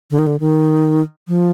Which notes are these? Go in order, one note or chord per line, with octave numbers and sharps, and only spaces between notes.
D3
D#3
D3
D#3
F3